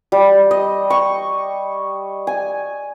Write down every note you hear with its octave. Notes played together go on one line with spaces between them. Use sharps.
G3
D#5
C#6
G#5